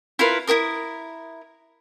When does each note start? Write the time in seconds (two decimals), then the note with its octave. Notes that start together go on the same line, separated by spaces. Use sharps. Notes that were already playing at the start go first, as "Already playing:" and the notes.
0.19 E4 F4 A#4 B4
0.47 E4 F#4 A#4 D#6